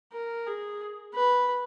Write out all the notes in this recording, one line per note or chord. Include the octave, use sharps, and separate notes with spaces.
A#4
G#4
B4